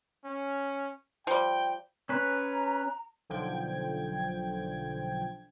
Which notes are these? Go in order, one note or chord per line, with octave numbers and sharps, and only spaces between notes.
C#4
F3 G3 G5
C#4 B4 A#5
B1 D3 F3 G5 G#6